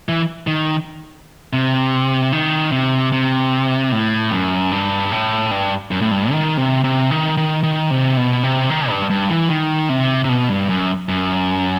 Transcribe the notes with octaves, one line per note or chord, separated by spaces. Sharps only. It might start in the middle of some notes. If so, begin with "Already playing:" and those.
E3
D#3
C3
D#3
C3
C3
A2
F#2
G2
A2
G2
F#2
A2
G2
D#3
C3
C3
D#3
D#3
D#3
C3
B2
C3
D#3
G2
G2
E3
D#3
C3
C3
B2
G2
F#2
F#2